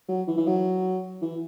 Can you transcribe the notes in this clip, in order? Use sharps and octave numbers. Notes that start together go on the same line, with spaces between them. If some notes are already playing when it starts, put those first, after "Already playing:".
F#3
E3
E3
F#3
E3